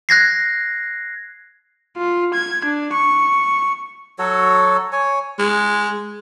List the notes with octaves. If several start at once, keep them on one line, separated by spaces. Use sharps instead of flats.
F#6 G#6 A#6 C7
F4
G#6
D4
C#6
F#3 F#4 A4 C#5
C#5 G#5
G#3